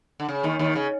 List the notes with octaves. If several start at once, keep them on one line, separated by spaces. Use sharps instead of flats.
D3
C#3
D#2 D#3
D#2 D#3
C#3